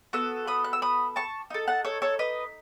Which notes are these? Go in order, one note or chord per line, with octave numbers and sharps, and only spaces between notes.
B3 F#4 A4 E6
B5 D#6
F#6
E6
B5 D#6
A5 C#6
D#4 A4
F#5 A5
A4 C#5
A4 C#5
B4 D#5